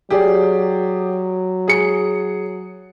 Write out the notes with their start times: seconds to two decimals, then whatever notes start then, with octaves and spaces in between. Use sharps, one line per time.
0.11 F#3 G4 G#4 D5
1.68 G#4 C#7